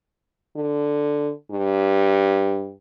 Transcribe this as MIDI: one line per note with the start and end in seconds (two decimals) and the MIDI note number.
0.56 1.31 50
1.51 2.72 43